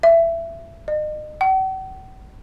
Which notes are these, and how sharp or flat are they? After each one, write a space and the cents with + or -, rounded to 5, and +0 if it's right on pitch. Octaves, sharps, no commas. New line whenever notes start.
E5 +20
D#5 -35
F#5 +45